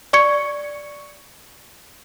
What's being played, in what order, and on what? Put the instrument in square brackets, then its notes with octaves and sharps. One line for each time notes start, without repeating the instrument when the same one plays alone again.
[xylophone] D5 C#6 G#6 C#7